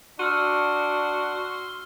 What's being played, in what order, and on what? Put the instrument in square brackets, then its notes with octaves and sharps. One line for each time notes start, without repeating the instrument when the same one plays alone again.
[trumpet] D4 [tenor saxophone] F#4 [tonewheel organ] C6 [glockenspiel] E6 F6 D#7